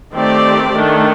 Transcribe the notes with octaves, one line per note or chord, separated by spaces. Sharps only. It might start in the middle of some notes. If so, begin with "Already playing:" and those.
D#3 A3 C4 G4 D5
D#3 A3 D4